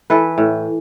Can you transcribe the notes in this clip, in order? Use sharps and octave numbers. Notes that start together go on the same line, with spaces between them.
E3 A4 B4
A2